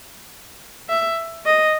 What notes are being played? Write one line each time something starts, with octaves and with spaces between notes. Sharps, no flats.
E5
D#5